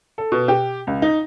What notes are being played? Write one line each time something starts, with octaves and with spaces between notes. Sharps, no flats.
A4
B2
G4
C#2
D#4